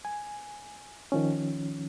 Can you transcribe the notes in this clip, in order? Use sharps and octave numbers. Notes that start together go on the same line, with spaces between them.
G#5
D#3 F3 C#4